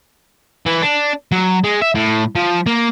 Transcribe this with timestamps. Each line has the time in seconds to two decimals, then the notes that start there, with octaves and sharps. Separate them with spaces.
0.66 E3
0.82 D4
1.32 F#3
1.64 G#3
1.82 E5
1.95 A2
2.36 F3
2.66 A#3